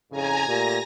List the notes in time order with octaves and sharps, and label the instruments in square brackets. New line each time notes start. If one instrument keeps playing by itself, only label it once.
[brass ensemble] F2 A2 C#3 [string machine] G#5 A#5
[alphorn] A#2 [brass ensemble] A3 G4 [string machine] A#6